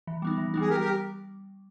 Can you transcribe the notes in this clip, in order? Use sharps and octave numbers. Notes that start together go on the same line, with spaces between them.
E3
G3 B3 D#4
E3
G3 B3 D#4
G#4
G3 G4 A#4
G4 A#4